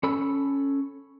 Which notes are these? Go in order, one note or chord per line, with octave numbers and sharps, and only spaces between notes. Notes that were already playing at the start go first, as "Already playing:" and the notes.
C#4 A4 B5 E6